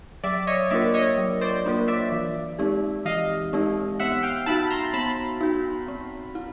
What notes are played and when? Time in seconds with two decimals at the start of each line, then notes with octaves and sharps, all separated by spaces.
0.24 F#3 D5 E5
0.47 C#5 D#5
0.70 A#3 D4 F4 A#4 D5 E5
0.94 C#5 D#5
1.18 F#3
1.41 C5 D5
1.65 A#3 D4 F4 A#4
1.88 D5 E5
2.12 E3
2.59 G#3 C4 D#4 G4
3.05 E3 D#5 F5
3.53 G#3 C4 D#4 G4
4.00 B3 E5 F#5
4.23 F5 G5
4.46 D#4 F#4 A5 B5
4.70 A#5 C6
4.93 B3 A5 B5
5.41 D#4 F#4
5.88 C4
6.35 E4